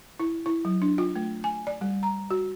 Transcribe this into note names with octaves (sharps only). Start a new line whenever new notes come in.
E4
E4
F#3
D4
F4
A3
G#5
D5
G3
A#5
F#4